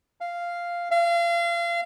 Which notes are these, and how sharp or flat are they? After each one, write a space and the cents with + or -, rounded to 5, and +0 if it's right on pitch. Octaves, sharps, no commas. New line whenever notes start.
F5 -5
F5 -30